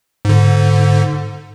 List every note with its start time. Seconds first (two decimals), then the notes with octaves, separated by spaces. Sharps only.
0.25 G#2 D3